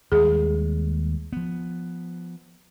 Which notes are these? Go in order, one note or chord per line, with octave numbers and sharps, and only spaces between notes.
D#2 G3 G#3 G#4
F3 B3